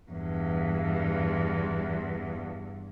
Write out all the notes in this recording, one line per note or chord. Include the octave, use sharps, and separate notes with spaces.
E2 G2